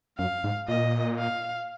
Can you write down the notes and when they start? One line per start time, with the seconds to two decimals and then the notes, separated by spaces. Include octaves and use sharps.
0.18 F#2 F5
0.44 G#2
0.68 A#2 D#5
1.19 F5